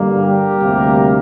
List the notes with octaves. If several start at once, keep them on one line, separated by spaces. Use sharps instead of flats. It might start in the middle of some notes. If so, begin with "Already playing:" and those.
Already playing: G2 D3 G3 A#3
G4 A#4
D2 C3 G3 A#3